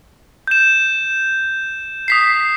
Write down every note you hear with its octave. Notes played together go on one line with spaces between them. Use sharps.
G6 E7
D#6 B6 C7